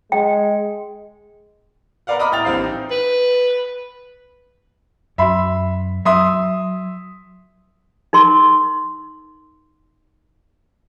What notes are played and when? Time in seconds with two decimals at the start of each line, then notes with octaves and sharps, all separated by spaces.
0.12 G#3 G5
2.07 A#4 B4 D5 F5 F#5
2.19 D#5 A#5 B5 D6 D#6 F6
2.32 A2 G5 F6 A6 F7
2.44 A#1 E3 C4 G4 F5 C7
2.64 D#4
2.91 B4
5.18 F#2 E5 B5 C6
6.05 F#3 E5 C6 D#6
8.13 D#4 A#4 C6